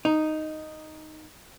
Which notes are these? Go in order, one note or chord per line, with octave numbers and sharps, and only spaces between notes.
D#4